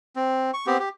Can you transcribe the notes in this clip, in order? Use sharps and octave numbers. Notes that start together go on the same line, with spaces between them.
C4
C#6
B3 C4 G4
G4